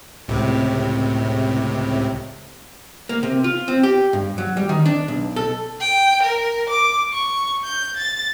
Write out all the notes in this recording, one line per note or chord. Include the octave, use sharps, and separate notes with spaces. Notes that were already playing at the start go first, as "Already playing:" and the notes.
C#2 A2 C3
A#3
C3
F4
C4
G4
G2
F#3
G3
D#3
D4
B1
A4
G5
A#4
D6
C#6
G6
A6